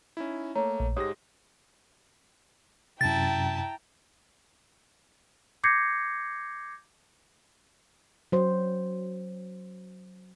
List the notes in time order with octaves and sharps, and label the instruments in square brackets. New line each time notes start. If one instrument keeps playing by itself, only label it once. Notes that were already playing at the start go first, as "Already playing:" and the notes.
[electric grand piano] C#4 D#4 E4
[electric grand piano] A3 A#3 [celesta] C#5 A#5
[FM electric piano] A#1
[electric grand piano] G#2 G#3 A#6 [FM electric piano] G4 C#5 [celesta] D#6
[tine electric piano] F#2 C3 [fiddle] E4 A5 [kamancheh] G5 A#5 [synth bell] A6
[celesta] D6 G6 G#6 A#6 C7 C#7
[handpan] F#3 C5